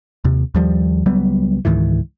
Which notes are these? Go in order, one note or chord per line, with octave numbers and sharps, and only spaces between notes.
D#2 C3
D#2 F3 G3
C#2 F#3 G3 B3
C#2 G#2 D#3 E3